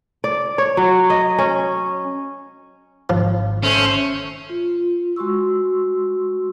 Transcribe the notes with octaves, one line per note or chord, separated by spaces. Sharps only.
D5
C#5
F#3
D#5
C#4
G#1 F3
A3 C#4 C5
F4
G#3 F#4 C6 C#6 E6